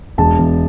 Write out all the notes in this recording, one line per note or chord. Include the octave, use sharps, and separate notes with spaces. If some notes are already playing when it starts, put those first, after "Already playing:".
E1 A5
E2